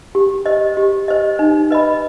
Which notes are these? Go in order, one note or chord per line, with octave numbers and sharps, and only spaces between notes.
G4
C5 D#5
G4
C5 D#5
D#4
B4 D#5 B5